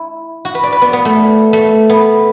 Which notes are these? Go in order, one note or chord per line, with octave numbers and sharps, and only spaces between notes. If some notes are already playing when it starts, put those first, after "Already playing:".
Already playing: E4
F#4
B4
D5
B4
B3
B3
A3
A3
B3